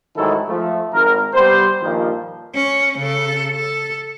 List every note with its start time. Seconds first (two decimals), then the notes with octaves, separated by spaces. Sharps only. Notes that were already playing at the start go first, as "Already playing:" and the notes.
0.16 A1 G#2 D#3 F#3 E4 A4
0.48 F3 A3
0.93 G#1 A#4
1.34 C3 G3 B3 C5
1.81 G2 A#2 D#3 F3
2.55 C#4
2.98 C#3 A4
3.56 A4